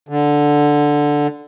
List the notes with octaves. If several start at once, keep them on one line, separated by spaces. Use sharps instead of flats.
D3